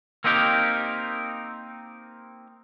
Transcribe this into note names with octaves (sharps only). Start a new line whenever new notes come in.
A#3 C4 D#4 G4 A#4